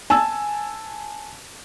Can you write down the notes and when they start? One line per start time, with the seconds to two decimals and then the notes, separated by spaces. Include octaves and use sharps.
0.10 G#5 A5 E6